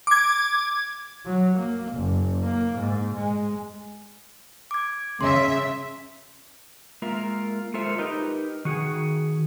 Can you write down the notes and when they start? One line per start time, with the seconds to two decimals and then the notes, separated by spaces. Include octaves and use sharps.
0.07 D6 G#6
1.26 F#3
1.59 A#3
1.94 F#1
2.44 A#3
2.80 G#2
3.16 G#3
4.71 D6 G#6
5.21 C#3 E5 C6
7.02 G#3 A#3 F4 A#4 E5
7.74 G#3 F4 A4 A#4 C5 E5
7.98 D#4 G4 A#4 B4 D#5
8.65 D#3 F#4 G#4